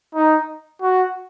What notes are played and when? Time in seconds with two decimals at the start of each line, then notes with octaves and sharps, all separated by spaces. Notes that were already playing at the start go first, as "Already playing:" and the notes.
0.15 D#4
0.82 F#4